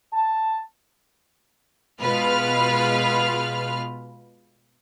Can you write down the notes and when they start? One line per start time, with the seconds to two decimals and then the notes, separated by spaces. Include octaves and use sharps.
0.13 A5
2.01 B2 G#3 F4 B4 F6